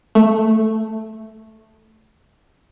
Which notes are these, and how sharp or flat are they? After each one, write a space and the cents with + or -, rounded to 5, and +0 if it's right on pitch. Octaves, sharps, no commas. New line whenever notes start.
A3 +0